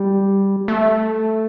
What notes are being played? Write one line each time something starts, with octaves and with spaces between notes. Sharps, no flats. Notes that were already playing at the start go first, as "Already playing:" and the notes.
Already playing: G3
A3